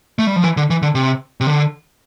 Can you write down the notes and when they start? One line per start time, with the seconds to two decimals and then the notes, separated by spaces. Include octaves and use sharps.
0.19 A3
0.27 G3
0.36 F3
0.44 E3
0.57 D3
0.70 E3
0.82 D3
0.95 C3
1.41 C3
1.47 D3